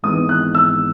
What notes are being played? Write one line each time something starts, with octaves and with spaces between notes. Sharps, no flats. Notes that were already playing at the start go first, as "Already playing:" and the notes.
G#1 G#2 E3 B3 D#6
F#6
E6